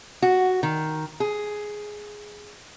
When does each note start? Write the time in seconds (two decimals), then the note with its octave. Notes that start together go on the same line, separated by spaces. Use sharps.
0.22 F#4
0.63 D#3
1.20 G#4